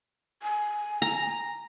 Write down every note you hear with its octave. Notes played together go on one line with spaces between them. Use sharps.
G#5
A#5